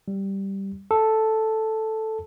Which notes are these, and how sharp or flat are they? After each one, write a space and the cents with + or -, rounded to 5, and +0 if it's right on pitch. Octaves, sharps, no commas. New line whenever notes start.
G3 -5
A4 +0